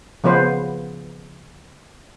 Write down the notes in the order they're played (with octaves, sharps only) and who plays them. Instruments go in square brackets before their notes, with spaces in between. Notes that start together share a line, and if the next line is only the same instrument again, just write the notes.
[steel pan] C#3 F3 B3 B4 C5